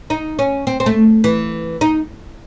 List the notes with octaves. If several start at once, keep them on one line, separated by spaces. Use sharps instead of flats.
D#4
C#4
C4
C4
A3
E3
D#4